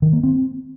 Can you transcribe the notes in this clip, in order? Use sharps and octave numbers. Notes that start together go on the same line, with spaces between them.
D#3
A#3
C4